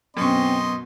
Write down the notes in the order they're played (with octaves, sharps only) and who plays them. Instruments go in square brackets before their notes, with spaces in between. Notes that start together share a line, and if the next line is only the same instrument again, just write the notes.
[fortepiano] F#2 C#6 [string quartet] B2 [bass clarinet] C4 [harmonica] D#5 C6